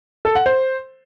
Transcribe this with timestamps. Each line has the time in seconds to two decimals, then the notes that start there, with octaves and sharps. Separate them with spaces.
0.25 A4
0.35 F#5
0.46 C5